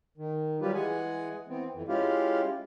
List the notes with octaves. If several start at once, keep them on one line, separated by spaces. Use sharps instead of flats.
D#3
F#3 G3 F4 G4 B4
E3 G#3 G#4 F#5 G#5
E3 B3 C4
F2 E3
G#3 C#4 E4 F4 G4 F5